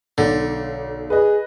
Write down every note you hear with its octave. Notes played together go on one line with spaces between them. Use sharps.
B1 D3
G#4 B4 D#5